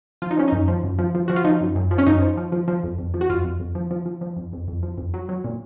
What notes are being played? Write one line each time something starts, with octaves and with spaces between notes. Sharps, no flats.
F3 F4
D#4
F3 C#4
F#2 D#4
F3
F#2
F3
F3
F3 F#4
F4
F3 D#4
F#2
F#2
F3
C#4
F#2 D#4
F3
F3
F3
F3
F2
F2
F3
F#4
F2 F4
F2
F2
F3
F3
F3
F3
F2
F2
F2
F3
F2
F#3
F#3
A#2